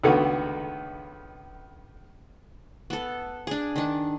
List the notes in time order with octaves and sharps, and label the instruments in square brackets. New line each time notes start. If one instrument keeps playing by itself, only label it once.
[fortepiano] C#2 D3 D#3 A3 B3 F#4
[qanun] B3 A4
D4 G#4
D#3 D4